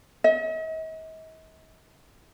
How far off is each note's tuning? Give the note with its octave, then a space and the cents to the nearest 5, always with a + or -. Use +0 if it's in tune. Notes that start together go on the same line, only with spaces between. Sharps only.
D#5 +45